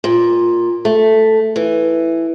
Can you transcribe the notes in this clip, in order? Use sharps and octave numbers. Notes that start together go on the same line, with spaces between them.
A#2
A3
E3